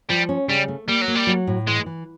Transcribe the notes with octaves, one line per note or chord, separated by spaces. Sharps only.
F3 G3
C#4
C#3 G3
A3
G3 A#3
F#3
A#3
G3
F#3
A2
E3 G#3
E3